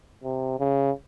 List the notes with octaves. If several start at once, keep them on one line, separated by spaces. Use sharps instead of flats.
C3
C#3